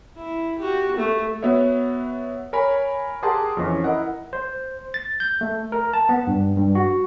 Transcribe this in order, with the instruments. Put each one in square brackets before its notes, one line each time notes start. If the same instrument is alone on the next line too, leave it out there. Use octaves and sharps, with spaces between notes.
[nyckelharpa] E4
F#4 G4
A3
[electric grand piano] B3 F#4 C#5 E5
A#4 C#5 G#5 B5
G4 G#4 A#4 F#5 A5 C6
F2 E3 C#4
E4 A#4 D#5 F#5
[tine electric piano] C5
A6
G6
A3
A#4
A5
B3
G2
G2
F#4